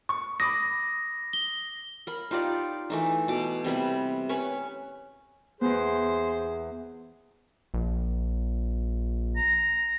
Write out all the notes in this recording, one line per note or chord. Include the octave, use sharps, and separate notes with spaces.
C#6
B5 D6 D#6 A#6
G7
A#4 B5
D#4 F4 G4 D5
E3 A3 D#4
B2 D6
C3 G3 B3 B4
C#4 B4 C#5
E2 B3 G#4 C5
A#1
A#5